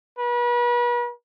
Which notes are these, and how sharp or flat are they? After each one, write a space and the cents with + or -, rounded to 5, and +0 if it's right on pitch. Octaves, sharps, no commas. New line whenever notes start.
B4 -40